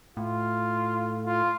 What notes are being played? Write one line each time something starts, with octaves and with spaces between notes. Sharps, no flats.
A2 F4
F4